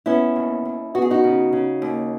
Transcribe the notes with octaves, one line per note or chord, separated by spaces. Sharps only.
B3 C#4 E4
D#2
D#2
B3 F#4
G#4
D#4 F#4
C#3
C#3
D#2